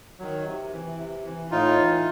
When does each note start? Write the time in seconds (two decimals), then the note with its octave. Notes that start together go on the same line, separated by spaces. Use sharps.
0.19 D#3 F#3
0.45 C3
0.72 E3
0.98 C3
1.24 E3
1.51 A2 D#4 F4
1.78 E3